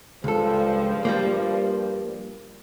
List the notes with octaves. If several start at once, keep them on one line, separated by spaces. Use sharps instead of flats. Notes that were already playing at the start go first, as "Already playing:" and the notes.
C#2 G2 F3 A4
G3 A#3